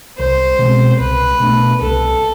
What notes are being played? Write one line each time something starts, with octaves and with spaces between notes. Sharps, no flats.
C2 C5
B2 G#3 C4
C2 B4
B2 A3 D4
C2 A4